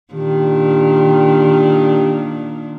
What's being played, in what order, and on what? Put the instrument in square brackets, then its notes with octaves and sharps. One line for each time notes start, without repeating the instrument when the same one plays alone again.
[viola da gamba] A#2 D#3 D4 [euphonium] G4